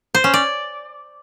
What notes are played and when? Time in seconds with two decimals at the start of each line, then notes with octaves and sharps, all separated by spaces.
0.15 C5
0.24 C#4
0.34 D5